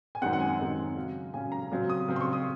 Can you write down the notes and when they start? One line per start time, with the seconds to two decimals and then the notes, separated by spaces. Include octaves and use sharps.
0.15 G#5
0.22 F#2 D#3 G#3 C4 F#5
0.33 F#5
0.40 G#5
0.58 F#2 D#3 G#3 C4
0.96 C#3 F#3 C#4
1.34 C#3 F#3 C#4 G#5
1.52 A#5
1.72 C#3 F#3 C4
1.90 D#6
2.08 C#3 F#3 C4
2.16 C6
2.21 C#6
2.33 D#6